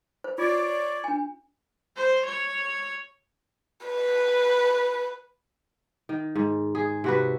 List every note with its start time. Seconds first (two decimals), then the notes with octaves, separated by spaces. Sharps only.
0.24 C5
0.38 F4 C#5 D5
1.04 D4 G#5
1.96 C5
2.25 C#5
3.87 B4
6.09 D#3
6.36 G#2
6.75 G#4
7.04 C3 F#4 B4